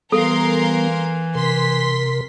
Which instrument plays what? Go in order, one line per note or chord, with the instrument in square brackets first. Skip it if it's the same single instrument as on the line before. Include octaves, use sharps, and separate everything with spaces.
[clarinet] E3 [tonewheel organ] G3 B3 [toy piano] A4 [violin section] A#4 F5 C6
[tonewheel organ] C3 A#4 [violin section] C6 B6